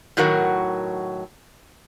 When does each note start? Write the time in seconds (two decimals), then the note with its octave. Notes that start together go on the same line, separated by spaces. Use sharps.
0.17 A2 D#3 F#3 F#4 A#4 F#5